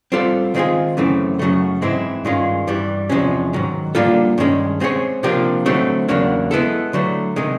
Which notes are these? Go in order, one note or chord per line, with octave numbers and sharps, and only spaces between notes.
G3 C4 F4 A4 D5
D#3 G#3 C4 F4 G#4
F#2 C#3 E3 A3 C4
F#2 C#3 F#3 A3
G#2 E3 G#3 C4 E4
G2 D#3 G#3 C#4 F4
G2 E3 G3
E2 C3 F3 G#3 C#4
G#2 D#3 F#3
G3 A#3 D4 F4 A4
G2 D#3 G#3 C#4
G#3 C4 F4 G#4 C#5
C3 F3 A#3 D4 G4
D3 F#3 A3 C4 D#4
E2 C#3 F#3 A#3 D4
G#3 B3 E4 A4
D3 F#3 A3
C3 D#3 G#3